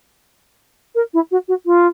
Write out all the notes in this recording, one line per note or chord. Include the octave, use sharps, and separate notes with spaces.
A#4
E4
F#4
F#4
F4